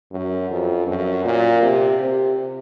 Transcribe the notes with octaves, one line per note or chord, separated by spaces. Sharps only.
F#2
F2
F#2
A#2
C3
C3